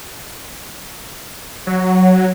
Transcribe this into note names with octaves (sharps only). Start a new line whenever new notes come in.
F#3